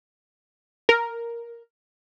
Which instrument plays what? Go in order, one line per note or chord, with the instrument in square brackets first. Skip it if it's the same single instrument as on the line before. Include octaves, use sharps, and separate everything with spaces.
[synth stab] A#4